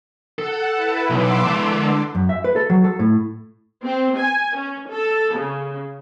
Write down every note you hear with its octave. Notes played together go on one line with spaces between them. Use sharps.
A4 F#5
E4 B4
B1 C6 D6 E6
D3 G#3 A5
F#2
E5
B4
A4
F#3
A4
A2
C4
G#5
C#4
A4
C#3